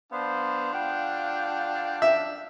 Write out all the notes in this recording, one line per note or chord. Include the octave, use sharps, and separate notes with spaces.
B3 D4 C5 F5 A5
F4 F#5 G5
E5